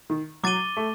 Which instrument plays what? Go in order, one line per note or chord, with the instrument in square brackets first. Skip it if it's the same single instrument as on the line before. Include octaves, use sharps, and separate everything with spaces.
[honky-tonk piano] D#3
[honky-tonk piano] F#3 [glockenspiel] D6 A6 D#7 G7
[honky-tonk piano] A3